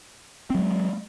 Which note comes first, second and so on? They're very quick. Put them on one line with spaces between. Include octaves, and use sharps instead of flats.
C4 F#3 G#3